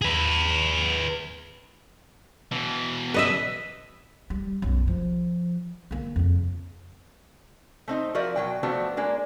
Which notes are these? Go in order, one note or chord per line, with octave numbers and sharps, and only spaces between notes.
G#4 B4
B2 E3
B4 D#5 E5
G3
B1 F#2
F3
D3 A#3
F2 C#3
A3 C4 D#4
F3 F#4 A#4 D5 E5
B2 F#3 G5
F3 A3 B3 C4 D4 F#4
G#3 A#3 D4